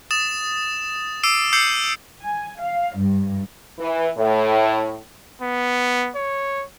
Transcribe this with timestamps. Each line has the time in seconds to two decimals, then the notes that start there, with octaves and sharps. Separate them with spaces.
0.11 D#6 A6 E7
1.23 D6 E6 C7 D7 D#7
1.53 D6 E6 G6 C7 C#7 F#7
2.23 G#5
2.60 F5
2.97 G2
3.78 E3
4.16 A2
5.42 B3
6.16 C#5